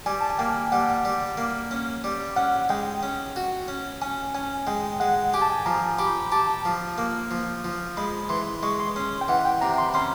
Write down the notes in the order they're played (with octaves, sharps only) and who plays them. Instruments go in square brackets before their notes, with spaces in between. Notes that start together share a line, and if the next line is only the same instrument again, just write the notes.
[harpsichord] G3 [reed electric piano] G#5
[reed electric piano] A5
G#5
[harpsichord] A#3 [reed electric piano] G5
[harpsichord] G3 [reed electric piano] F#5
[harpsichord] G3
A#3
C#4
G3
[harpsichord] C#4 [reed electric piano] F#5
[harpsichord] G#3 [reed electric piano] G5
[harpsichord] C#4
F#4
C#4
[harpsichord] C#4 [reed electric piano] G#5
[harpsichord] C#4 [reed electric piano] G#5
[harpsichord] G#3 [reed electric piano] G5
[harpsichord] G#3 [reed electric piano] F#5
[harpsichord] G4 [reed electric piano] G#5
[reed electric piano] A5
G#5
[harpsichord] F3 [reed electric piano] A#5
[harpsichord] G4 [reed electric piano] B5
[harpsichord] G4 [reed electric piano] A5
[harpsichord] F3
A#3
F3
F3
[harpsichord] G#3 [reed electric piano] B5
[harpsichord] E3 [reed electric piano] C6
[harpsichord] G#3 [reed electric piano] C#6
[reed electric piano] C6
[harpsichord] C#4 [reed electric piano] C6
[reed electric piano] G5
[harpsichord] E3 [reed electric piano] F#5
[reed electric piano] G5
[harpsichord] C3 [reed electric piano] A#5
[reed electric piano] C6
B5
[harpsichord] C#4 [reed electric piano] C6